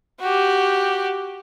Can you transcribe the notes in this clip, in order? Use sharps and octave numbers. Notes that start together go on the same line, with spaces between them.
F#4 G4